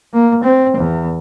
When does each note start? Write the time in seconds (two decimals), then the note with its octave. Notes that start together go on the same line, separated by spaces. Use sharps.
0.14 A#3
0.44 C4
0.77 E2